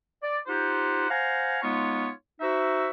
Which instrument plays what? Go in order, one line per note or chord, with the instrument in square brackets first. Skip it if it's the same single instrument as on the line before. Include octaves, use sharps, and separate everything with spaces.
[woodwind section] D5
D#4 F4 G4 C5 F#5
C5 F5 F#5 G#5 A#5
G#3 B3 D#4 F4 C#5
D#4 F#4 C5 E5